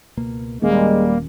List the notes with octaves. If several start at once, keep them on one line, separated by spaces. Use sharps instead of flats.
C#2 B2 A#3
D#1 D#3 G3 G#3 A#3 C#4